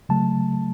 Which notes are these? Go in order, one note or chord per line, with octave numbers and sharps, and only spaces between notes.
C#3 F#3 A3 A5